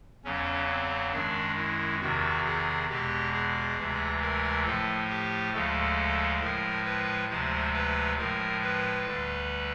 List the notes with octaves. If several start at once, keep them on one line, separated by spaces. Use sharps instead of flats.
E2 C#3 F#3 C#4
C4
F#2 D#3 G#3 D4
E4
E2 C3 D#3 F#4
G#4
E2 B2 G#3 G4
G#4
D2 C3 E3 G#3
A#4
A2 F3 A3 A4
G4
D2 C#3 F3 G#3 A4
A2 F3 G#3 A#4
B4
D2 C3 F3 G#3 C5
B4
A2 F3 G#3 A#4
B4
D2 D3 G3